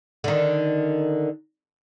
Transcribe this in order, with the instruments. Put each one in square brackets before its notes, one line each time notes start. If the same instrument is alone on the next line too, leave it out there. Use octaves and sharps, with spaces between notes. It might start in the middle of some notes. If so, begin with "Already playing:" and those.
[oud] D3 D#3